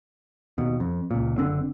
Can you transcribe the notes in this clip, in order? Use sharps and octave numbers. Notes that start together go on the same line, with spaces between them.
D#2 B2
F2
C#2 A#2
F#1 D3 C4